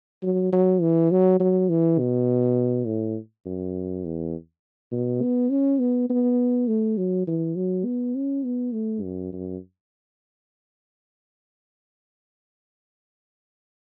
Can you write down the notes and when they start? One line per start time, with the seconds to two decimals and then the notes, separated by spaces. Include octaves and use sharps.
0.23 F#3
0.52 F#3
0.81 E3
1.11 F#3
1.40 F#3
1.70 E3
1.99 B2
2.86 A2
3.46 F#2
4.04 E2
4.92 B2
5.22 B3
5.51 C#4
5.80 B3
6.10 B3
6.68 A3
6.97 F#3
7.27 E3
7.56 F#3
7.85 B3
8.15 C#4
8.45 B3
8.73 A3
9.02 F#2
9.33 F#2